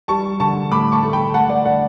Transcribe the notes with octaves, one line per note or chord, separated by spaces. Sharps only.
G3 A5 C#6
D3 A5 C#6
A2 B5 D6
A5 C#6
A3
G5 B5
A3 F#5 A5
D5 F#5
D3 D5 F#5